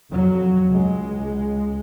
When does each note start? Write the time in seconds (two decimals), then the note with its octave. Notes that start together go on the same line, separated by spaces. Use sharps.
0.12 F2 F#3
0.68 C#2 G#3